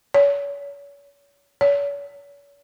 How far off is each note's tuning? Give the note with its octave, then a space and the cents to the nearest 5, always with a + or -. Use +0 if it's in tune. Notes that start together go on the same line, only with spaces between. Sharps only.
C#5 +40
C#5 +45